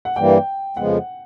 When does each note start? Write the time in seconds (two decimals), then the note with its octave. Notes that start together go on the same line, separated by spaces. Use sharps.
0.05 F#5
0.16 G2 E3 G3 A#3 G5
0.77 F2 C#3 F3 G#3 B3 F#5